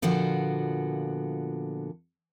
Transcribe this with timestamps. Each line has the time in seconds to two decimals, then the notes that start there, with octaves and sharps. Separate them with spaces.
0.02 A#2 D3 F3 B3 F#4